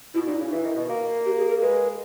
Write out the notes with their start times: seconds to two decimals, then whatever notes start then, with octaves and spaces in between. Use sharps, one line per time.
0.14 B2 E4
0.27 A#2 D#4
0.39 C#3 E4
0.51 E3
0.64 D#3
0.76 B2
0.89 A#3
1.26 G4
1.38 G#4
1.50 A#4
1.62 G#3 B4